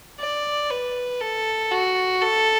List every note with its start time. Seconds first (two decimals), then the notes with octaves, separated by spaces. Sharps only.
0.19 D5
0.70 B4
1.21 A4
1.71 F#4
2.22 A4